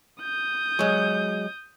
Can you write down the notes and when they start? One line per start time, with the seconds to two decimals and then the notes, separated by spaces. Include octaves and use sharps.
0.23 D#6 G6
0.79 F#3 G#3